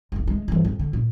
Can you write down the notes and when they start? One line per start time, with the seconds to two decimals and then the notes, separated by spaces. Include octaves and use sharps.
0.12 F1 C2
0.28 G#3 A3
0.48 G2 E3
0.65 F2
0.80 D3
0.93 A#2